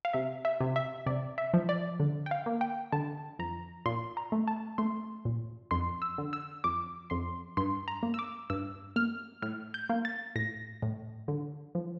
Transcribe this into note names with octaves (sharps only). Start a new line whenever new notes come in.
F5
C3 E5
E5
C3
E5
C3 D5
E5
F3
D5
D3
G5
F5
A#3
G5
D3 A5
F2 A#5
A#2 C6
A#5
A3
A5
A3 C6
A#2
F2 C6
E6
D3
E6
F2 D6
F2 C6
G2 C6
A#5
A#3
E6
D6
G2 E6
A#3 F6
A2 F6
G6
A#3
A6
A2 A#6
A2
D3
F3